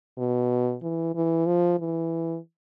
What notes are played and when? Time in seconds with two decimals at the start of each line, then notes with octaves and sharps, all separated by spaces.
0.18 B2
0.82 E3
1.15 E3
1.46 F3
1.79 E3